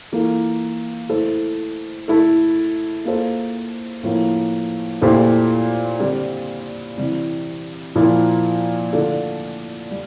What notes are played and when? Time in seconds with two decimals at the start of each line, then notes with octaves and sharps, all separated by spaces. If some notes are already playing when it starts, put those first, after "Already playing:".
0.12 E3 A#3 F4 A4
1.09 A3 E4 A4 C5
2.08 A3 E4 A4
3.05 A#3 F4 A4 C5
4.03 A2 F3 A#3
5.02 A#2 A3 E4 G4 C5
6.00 D3 G3 C4 G4
6.97 C3 E3 G3
7.95 A#2 F3 A#3 E4
8.93 D3 A3 D4 F4 A4
9.91 G3